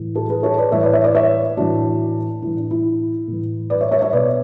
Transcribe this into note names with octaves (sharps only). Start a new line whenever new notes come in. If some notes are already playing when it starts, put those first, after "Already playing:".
Already playing: A2 E3
F#4 A4
G#4 B4
A4 C#5
B4 D5
A2 E3 C#5 E5
B4 D5
C#5 E5
B4 D5
C#5 E5
A2 E3 D4 F#4
A2 E3 E4
D4
E4
A2 E3
B4 D5
C#5 E5
C#5 E5
C#5 E5
B2 B4 D5